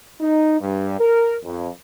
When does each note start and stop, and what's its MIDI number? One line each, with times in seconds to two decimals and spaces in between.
0.21 0.57 63
0.60 0.99 43
1.00 1.35 70
1.44 1.68 41